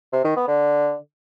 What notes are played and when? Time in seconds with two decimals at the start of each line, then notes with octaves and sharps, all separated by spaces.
0.13 C3
0.25 D#3
0.36 B3
0.48 D3